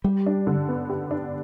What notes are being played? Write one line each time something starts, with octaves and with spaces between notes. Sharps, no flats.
G3 G4
D4
D3
B3
G4
D4